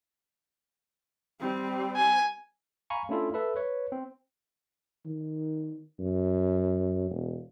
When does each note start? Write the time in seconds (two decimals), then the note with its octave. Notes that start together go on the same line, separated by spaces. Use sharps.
1.40 G3 C4
1.96 G#5
2.90 F5 G#5 A#5 B5 C#6
3.09 A3 C#4 D4 E4 F4 A4
3.34 A4 B4 E5 B5
3.56 B4 C#5
3.92 C4
5.06 D#3
5.99 F#2
7.11 E1